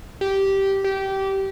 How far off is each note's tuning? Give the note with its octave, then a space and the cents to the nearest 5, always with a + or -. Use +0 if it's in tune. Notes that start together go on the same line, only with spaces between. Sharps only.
G4 -10
G4 -20